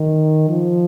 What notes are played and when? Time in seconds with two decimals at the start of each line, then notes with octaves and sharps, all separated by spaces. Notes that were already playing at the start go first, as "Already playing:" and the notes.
Already playing: D#3
0.48 F3